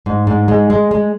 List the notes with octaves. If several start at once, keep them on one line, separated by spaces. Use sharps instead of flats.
G#2
G#2
G#3
G#3
G#3